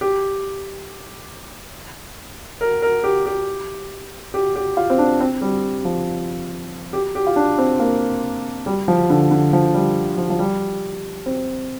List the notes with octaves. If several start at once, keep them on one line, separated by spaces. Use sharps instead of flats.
G4
A#4
A#4
G4
G4
G4
G4
F4
C4
D4
C4
G3
F3
G4
G4
F4
D4
C4
A#3
G3
F3
D3
D3
F3
G3
F3
F3
G3
C4